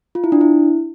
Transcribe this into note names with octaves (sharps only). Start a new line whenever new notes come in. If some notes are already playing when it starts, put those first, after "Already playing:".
F4
E4
D4
E4